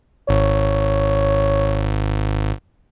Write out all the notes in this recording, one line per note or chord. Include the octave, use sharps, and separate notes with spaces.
G#1 C#5